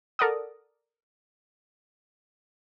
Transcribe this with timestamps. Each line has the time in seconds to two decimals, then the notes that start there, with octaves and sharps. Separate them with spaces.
0.19 A4 A#4 D5 F#5 D#6